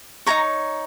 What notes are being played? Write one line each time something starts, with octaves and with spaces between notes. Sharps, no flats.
D#4 F#4 C#5 A#5